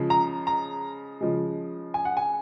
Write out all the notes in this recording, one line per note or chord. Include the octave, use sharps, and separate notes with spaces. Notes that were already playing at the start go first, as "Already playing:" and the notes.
Already playing: C#3 F3 G#3
A#5
A#5
C#3 F3 G#3
G#5
F#5
G#5